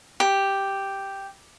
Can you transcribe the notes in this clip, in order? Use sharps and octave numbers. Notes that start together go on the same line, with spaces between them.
G4